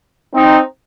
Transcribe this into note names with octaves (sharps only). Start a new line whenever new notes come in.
C4 D#4